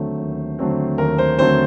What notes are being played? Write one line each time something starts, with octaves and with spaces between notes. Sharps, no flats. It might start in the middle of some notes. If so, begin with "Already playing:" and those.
Already playing: D#2 D3 F#3 A3 C4 C5
D#2
D3 F#3 A3 C4
D#2 A#4
C5
D3 F#3 A3 C4 C5